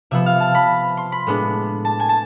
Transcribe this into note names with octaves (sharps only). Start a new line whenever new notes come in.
C3 F3 B3 E5
F5
A5
B5
C6
B5
A2 G#3 B3 D4
A5
G#5
A5